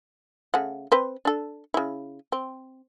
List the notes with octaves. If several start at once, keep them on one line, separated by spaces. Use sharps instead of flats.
C#3 A3 F#5
C4 B4 C5
D4 A4
C#3 E4
C4